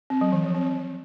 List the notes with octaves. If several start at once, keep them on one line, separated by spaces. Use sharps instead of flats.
C4
F#3
E3
F3
C4